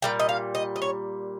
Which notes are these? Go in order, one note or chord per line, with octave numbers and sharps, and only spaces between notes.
A#2 G3 G5
D#5
F5
D#5
D#5
C#5